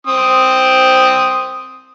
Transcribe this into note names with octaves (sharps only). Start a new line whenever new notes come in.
C4 D#6